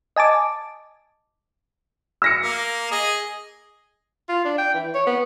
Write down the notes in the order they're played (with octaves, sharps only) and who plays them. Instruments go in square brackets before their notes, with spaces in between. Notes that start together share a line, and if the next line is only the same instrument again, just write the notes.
[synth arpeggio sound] D#5 G#5 A5 D6
[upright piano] E6 A#6 C#7
[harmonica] A#3
G#4 D#5
[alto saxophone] F4
D4
G5
E3
C#5
B3